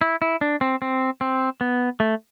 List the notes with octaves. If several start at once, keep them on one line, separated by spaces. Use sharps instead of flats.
E4
E4
D4
C4
C4
C4
B3
A3